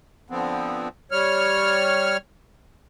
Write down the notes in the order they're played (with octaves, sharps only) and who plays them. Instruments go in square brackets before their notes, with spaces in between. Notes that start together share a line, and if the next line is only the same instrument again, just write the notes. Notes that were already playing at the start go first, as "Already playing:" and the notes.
[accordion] D3 F3 B3 C4
G3 C#5 F6